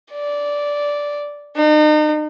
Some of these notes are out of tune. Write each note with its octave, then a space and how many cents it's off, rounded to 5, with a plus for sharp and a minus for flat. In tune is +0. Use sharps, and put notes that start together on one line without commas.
D5 -10
D#4 -40